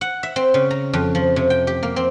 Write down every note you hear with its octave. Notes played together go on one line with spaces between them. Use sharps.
F#5
E5
C4
C#3
A#5
F2
F3
C3
G5
G4
A#3
C4